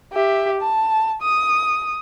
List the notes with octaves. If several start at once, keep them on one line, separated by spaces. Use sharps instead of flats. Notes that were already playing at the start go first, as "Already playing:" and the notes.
G4 E5
A5
D#6